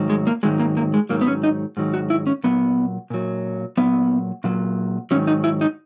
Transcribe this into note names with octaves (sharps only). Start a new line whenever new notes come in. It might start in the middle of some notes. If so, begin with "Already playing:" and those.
Already playing: G#2 D#3 F#3
G#3
A#3
G#2 D#3 F#3 G#3
A#3
A#3
G#3
G#2 D#3 F#3 A#3
B3
C#4
D#4
G#2 D#3 F#3
F#4
E4
C#4
A#2 F#3 B3
A#2 F#3
A#2 F#3 B3
A#2 F#3
G#2 D#3 F#3 C#4
D#4
E4
D#4